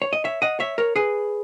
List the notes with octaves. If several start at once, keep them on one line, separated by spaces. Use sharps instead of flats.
C#5
D#5
C#5 E5
D#5 F#5
C#5 E5
A#4 C#5
G#4 B4